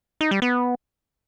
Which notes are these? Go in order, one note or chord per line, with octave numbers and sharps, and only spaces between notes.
D#4
G3
B3